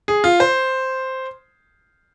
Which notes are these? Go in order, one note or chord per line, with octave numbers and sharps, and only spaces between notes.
G#4
F4
C5